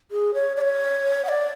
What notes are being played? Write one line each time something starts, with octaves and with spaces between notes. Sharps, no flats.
G#4
C#5
D5
C#5
F#5
D5